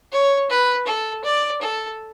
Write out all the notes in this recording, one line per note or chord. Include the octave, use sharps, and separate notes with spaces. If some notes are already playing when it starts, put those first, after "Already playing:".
C#5
B4
A4
D5
A4